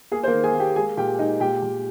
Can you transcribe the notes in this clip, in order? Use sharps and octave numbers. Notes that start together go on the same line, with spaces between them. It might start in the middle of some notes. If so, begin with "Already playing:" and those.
A#3 G#4
C5
A#3 A#4
D#3
G#4 G#5
A#3
G4 G5
G#3 G#4 G#5
A#2 G4 G5
G#3 D#4 D#5
A#2 G4 G5
A#2